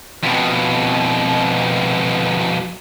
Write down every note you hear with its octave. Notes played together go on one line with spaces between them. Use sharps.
F2 B2